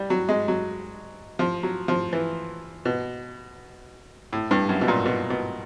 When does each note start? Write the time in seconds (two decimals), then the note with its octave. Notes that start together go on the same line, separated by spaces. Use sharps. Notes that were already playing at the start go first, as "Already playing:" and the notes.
Already playing: G3
0.10 F#3
0.29 G#3
0.48 F#3
1.39 F3
1.63 F#3
1.88 F3
2.13 E3
2.85 B2
4.33 A2
4.51 G2
4.69 F#2
4.81 B2
4.88 A#2
5.06 B2
5.30 B2